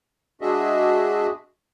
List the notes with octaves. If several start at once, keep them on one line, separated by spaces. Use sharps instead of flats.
G#3 D4 F#4 G#4 D#5 E5